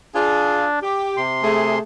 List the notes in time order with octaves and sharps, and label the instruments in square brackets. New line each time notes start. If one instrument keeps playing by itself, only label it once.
[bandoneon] D4 [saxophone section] F4 G#4
[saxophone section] G4
[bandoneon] C3 C6
[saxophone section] A3 G#4